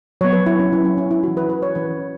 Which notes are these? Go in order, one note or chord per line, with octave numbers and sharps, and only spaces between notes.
F#3 B3 C#5
B4
E4
C#4
F#3 B3 E4
C#4
C#4
E4
E3 C#4 F#4
B4
B4
C#5
E3 C#4 B4